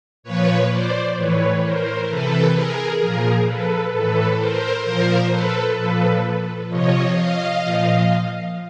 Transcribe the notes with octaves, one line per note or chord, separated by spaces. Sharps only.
A#2 F3 B4 C#5
C5 D5
A2 E3 B4 C#5
A#4 C5
C3 E3 A4 B4
G#4 A#4
A#2 F3 G#4 A#4
A4 B4
A2 E3 A4 B4
A#4 C5
A#2 F3 A#4 C5
A4 B4
A#2 F3 A4 B4
C3 F3 C#5 D#5
D#5 F5
A#2 F3